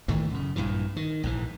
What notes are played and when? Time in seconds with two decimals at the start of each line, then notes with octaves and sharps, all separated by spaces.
0.08 A2 D#3 E3 A3
0.30 F#2 C#3
0.56 A#1 G2 A#2 E3
0.96 D#3
1.24 A#1 G#2 E3